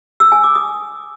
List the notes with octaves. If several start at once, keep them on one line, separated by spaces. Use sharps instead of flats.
E6
G#5
D6
D#6